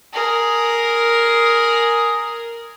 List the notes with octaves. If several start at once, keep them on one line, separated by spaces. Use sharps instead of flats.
G#4 A#4